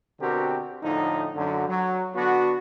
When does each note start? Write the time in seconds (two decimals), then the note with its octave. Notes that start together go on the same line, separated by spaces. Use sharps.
0.20 B2 D3 C4 F#4 G4 A#4
0.83 A2 D3 F3 D#4
1.35 F#2 D3 F#3
1.68 F#3
2.15 D3 B3 D4 F#4